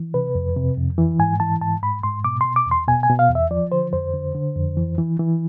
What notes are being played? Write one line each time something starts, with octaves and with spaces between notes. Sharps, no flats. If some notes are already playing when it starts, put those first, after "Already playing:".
Already playing: E3
C3 B4
F2
C3
F2
E3
G#2 G#5
E3 A5
G#2 A5
G#2 B5
G#2 C6
B2 D6
B2 C6
D6
E2
C6
B2 G#5
G#5
B2
F5
E2
E5
F3 D5
D3 C5
F2 C5
D3
D3
F2
E3
E3
E3